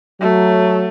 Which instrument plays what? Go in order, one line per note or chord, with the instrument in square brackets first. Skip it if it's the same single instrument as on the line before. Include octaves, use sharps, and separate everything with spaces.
[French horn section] F#3 [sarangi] A3